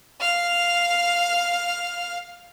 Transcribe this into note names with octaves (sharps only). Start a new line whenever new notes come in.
F5 F6